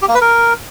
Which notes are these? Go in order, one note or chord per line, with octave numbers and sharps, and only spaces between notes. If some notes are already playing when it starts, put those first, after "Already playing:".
G4
A#3
B4
A#4